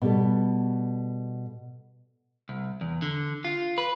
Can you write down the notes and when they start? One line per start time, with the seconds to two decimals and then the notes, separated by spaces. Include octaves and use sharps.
0.02 B2 G3 A4
2.49 C2
2.81 E2
3.02 D3
3.45 F4
3.78 B4